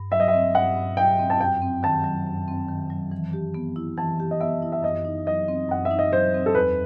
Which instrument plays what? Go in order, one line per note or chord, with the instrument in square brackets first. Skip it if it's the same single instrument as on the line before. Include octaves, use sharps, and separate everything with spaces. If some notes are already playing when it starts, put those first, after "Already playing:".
Already playing: [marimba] G2
[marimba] F#3 [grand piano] E5
[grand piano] D#5
E5
[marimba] C4
[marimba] G2 [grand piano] F#5
[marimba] G2
[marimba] F#3 [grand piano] G5
[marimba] C4
[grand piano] A5
[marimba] F#2 [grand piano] G5
[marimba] C4
[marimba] D#3 [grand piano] A5
[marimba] F#3
F#2
C4
D#3
F#3
E3
G4
B3
E4
[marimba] E3 [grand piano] A5
[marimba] G4
[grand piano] D#5
[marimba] B3 [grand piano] E5
[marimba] E4
[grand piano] E5
[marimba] F#2 [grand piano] D#5
[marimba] D#4
[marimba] F#3 [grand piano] D#5
[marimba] C4
[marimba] F#2 [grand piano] F#5
[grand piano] E5
[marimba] D#4
[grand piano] D#5
[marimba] F#3 [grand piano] C5
[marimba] C4
[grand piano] A4
[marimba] E2 [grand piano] B4